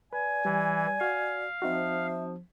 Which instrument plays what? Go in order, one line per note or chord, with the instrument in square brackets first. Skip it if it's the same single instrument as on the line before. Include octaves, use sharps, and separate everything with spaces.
[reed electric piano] B4 [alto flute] D5 [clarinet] G#5
[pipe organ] E3 [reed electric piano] G3
[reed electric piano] F#4 G#6 [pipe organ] F5
[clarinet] F3 [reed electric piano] C4 D#4 F#4 [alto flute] E5